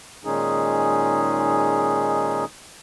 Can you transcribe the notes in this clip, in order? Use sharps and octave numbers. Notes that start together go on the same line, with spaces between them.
A#2 D#3 G#3 C#4 D#4 G#4